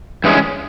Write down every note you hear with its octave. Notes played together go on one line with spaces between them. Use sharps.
G2 E3 G#3 C#4